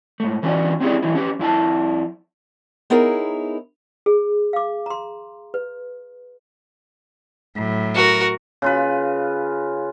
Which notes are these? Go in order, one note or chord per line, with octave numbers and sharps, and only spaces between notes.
G#2 A3
E3 A3 C#4 F#4 C#5 D5
C4 C#4 E4 G4 G#4 D5
E3 F#3 D#4 E4
C#4 G4 B4
F2 E4 G#5 A5
B3 D#4 E4 G#4 A#4 C#5
G#4
F5 D6
A#5 C6
B4
A2 F#3
F#4 A#4
C#3 F4 B4